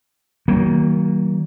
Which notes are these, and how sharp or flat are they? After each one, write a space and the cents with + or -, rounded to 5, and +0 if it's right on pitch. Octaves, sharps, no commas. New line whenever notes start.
D#3 +30 F#3 +45 A#3 +0